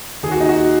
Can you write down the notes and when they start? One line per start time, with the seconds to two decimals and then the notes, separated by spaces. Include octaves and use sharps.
0.23 D#2 G#4
0.31 F#4
0.41 D#4
0.49 F#4